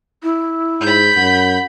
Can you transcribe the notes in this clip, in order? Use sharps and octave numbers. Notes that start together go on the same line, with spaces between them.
E4
G#2 B5 G6
F#2 F#5